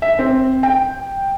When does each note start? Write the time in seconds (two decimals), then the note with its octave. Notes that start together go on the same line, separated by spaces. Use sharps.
0.02 E5
0.19 C4
0.63 G5